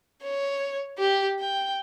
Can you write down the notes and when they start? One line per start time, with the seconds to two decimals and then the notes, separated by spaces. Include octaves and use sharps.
0.23 C#5
0.99 G4
1.40 G5